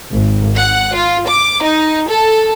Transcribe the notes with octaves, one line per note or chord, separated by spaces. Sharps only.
G#1
F#5
F4
D6
D#4
A4